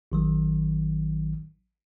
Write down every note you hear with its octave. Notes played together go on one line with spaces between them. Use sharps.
A1 D#3 F#3